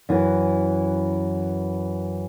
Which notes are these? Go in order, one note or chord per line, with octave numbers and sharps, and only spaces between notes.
F#2 E3